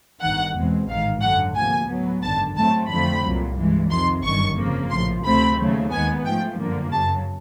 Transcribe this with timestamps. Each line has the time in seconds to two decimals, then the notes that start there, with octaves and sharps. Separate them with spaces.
0.21 G1 G2 D#3 F#5
0.55 E2 B2 G#3 C4
0.88 A1 G#2 D#3 F5
1.21 G#1 F#2 D3 F#3 F#5
1.55 D2 C3 F3 A#3 G#5
1.88 A2 F#3 B3
2.22 G#1 F#2 D3 A5
2.56 A2 F#3 A3 C4 A5
2.89 F2 D3 F3 A3 C4 B5
3.23 C2 A#2 F#3
3.57 G2 E3 G#3
3.90 F2 C3 D#3 C6
4.23 G1 F#2 D#3 G3 C#6
4.57 F2 C#3 F3 A#3
4.90 A#1 A2 F3 C6
5.24 D2 C3 F3 A3 C4 B5
5.58 D#2 C#3 F#3 A3
5.91 D#2 D#3 G#3 B3 G#5
6.25 G#2 F3 A3 G5
6.58 G1 F#2 D3 F3 A#3
6.92 F#2 C#3 F#3 A5